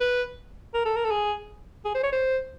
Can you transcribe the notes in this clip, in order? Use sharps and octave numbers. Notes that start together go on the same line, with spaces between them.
B4
A#4
A4
A#4
A4
G#4
G#4
C5
C#5
C5